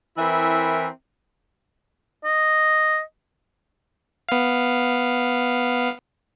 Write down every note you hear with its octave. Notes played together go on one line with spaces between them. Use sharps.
E3 C4 E4 A#4 E5
D#5
B3 F5